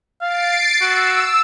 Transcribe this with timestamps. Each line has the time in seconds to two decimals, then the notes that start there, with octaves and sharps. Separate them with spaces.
0.21 F5 A6 C7 D7
0.81 F#4 E6